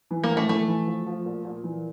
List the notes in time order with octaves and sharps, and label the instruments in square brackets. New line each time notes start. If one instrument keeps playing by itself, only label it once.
[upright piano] E3
[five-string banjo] A#3
[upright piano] A1
[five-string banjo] A3
[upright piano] E3 [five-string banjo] A3
[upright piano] E3
F3
F3
A#2
A#2
E3